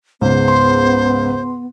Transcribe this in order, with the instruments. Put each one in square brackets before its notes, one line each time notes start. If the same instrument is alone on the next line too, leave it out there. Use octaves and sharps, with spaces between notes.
[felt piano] C#2 G#2 [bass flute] B3 [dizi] C5
[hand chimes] C6